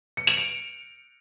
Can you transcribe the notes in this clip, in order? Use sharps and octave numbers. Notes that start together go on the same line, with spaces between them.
C#7
F7
D7